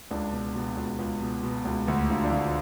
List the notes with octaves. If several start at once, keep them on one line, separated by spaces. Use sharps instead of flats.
C#2 D4
B2
B2
C#2
C#2
B2
B2
C#2
D2 F#4
D3 F4
D4
D3 F4